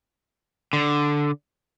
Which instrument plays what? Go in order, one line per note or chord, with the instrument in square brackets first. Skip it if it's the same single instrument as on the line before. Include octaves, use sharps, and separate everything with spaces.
[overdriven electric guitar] D3